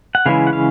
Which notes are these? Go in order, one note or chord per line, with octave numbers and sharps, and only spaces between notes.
F#5
C#3 E3 G#3 C#4 E4 F5
F#5
F5